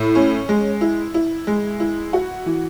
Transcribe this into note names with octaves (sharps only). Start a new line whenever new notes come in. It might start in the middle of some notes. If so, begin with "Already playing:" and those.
Already playing: A2
C#4
G#3
E4
E4
G#3
E4
F#4
E3